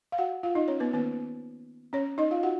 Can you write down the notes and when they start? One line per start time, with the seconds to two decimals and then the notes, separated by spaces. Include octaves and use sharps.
0.12 F5
0.18 F#4 F#5
0.43 F4 F5
0.55 D#4 D#5
0.68 C#4 C#5
0.80 B3 B4
0.93 D#3 A#3 B3 C#4 B4
1.93 C#4 C#5
2.18 D#4 D#5
2.31 F4 F5
2.43 F#4 F#5